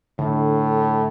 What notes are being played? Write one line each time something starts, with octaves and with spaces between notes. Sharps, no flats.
A2 D3